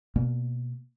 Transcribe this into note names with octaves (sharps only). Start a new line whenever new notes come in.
B2 A#3